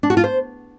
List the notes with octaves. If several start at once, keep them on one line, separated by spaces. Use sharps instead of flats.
D4
F#4
F4
C5